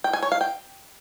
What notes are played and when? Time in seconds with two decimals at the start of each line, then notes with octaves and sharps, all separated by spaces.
0.04 G5
0.13 G#5
0.22 C#5
0.32 F5
0.41 G5